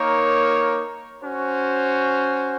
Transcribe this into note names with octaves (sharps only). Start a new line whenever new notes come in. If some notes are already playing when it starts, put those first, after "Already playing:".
Already playing: A#3 D#4 A#4 C#5
C#4 F#4 C5